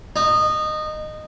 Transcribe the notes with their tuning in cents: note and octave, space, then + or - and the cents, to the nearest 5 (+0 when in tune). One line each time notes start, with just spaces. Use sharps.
D#4 -20